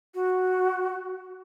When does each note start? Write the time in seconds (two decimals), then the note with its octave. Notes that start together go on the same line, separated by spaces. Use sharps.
0.15 F#4